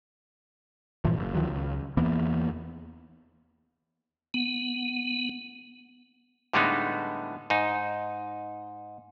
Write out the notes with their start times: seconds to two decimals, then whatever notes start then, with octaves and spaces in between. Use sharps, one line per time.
1.05 G2 A#2 E3 F3
1.17 F#1
1.35 D2 D#3 F3 F#3
1.48 C#2
1.97 E2 E3 A#3 B3
4.34 B3
6.53 A2 D3 G3 G#3 B3 D#4
7.50 G#2 D#4